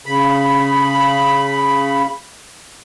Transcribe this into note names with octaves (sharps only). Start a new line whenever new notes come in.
C#3 B5